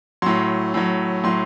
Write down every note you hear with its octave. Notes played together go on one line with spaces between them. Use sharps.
A2 F#3 C6
A2 F#3
A2 F#3 C6